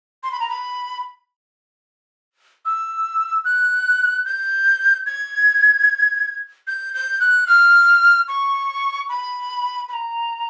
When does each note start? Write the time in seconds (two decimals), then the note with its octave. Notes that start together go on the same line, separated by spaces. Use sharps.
0.23 C6
0.32 B5
0.40 A#5
0.49 B5
2.65 E6
3.45 F#6
4.25 G6
5.06 G#6
6.67 G6
6.94 G6
7.20 F#6
7.47 F6
8.28 C#6
9.09 B5
9.89 B5
9.93 A#5